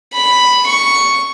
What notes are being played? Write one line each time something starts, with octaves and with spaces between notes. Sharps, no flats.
B5
C#6